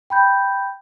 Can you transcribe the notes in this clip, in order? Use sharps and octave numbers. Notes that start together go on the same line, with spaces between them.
G5 B5 G6